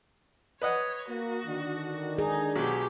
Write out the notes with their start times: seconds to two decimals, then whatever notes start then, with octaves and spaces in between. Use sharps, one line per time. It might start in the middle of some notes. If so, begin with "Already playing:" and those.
0.62 B4 C#5 D#5 F#5
1.09 A#3 F#4
1.46 D3 D#3 D4
2.18 D#4 G#4
2.56 B1 F#3 G4